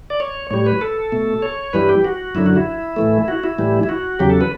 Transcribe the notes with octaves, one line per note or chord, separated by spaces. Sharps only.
D5
C#5
A2 G3 C#5
B4
A4
B2 A3
C#5
G2 E3 G3 B4
G4
F#4
F#2 D3 F#3 E4
F#4
E4
A2 E3 A3
F#4
E4
A2 E3 G3
E4
F#4
E2 C#3 F#3 G4
A4
B4